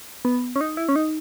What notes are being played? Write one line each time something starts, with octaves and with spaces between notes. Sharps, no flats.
B3
C#4
D#4
E4
C#4
D#4